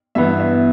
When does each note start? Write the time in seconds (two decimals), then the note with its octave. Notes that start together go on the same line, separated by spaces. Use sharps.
0.15 G2 E3 B3 E4 E5
0.40 E5